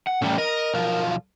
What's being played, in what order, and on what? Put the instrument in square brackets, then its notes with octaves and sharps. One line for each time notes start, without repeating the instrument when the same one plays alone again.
[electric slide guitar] F#5
[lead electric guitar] A2 G3 [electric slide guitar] E3 A3 C#4
[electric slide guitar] A#4 [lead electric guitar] D#5
[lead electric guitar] B1 F3